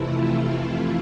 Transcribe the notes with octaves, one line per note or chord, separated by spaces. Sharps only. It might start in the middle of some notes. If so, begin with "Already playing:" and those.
Already playing: F2 C3 E3 A3 E4 F4